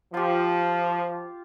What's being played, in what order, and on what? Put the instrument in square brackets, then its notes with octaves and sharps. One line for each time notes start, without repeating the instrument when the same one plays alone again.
[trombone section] F3 [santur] F4 G4